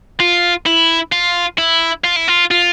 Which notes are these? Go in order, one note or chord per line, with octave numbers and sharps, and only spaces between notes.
F4
E4
F4
E4
F4
E4
F4
F4